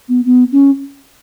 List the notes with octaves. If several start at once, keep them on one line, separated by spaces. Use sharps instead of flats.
B3
B3
C#4